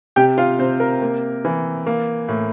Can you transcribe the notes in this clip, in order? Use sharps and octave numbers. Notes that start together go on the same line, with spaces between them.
C3 G4 G5
F4 F5
C3 C4 C5
A#4
A#3
E3
A#3
A2